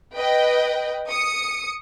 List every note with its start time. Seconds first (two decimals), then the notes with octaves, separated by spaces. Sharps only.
0.15 B4 D#5 G5
1.11 D#6 C#7